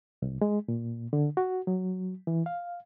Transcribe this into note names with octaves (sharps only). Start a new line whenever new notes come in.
C2
G#3
A#2
D3
F#4
F#3
E3
F5